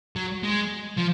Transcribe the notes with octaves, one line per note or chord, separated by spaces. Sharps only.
F#3
G#3
F3